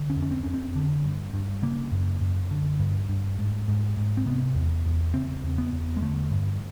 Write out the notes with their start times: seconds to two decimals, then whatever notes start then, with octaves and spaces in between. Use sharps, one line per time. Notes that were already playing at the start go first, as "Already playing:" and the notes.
Already playing: D3
0.10 C#4
0.16 F2
0.22 C#4
0.31 C4
0.43 F2 C#4
0.54 C4
0.75 D3
1.05 G2
1.34 G2
1.63 C#3 A#3
1.92 F#2
2.21 F#2
2.51 D3
2.80 G2
3.09 G2
3.38 G#2
3.68 G#2
3.97 G#2
4.17 C4
4.26 C3 B3
4.55 E2
4.86 E2
5.14 C#3 C4
5.44 E2
5.58 B3
5.73 E2
5.97 G#3
6.02 D3 A3
6.31 G2